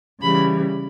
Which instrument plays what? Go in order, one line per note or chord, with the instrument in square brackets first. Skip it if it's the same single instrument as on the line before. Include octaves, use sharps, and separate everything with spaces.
[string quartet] C#3 E3 G3 B5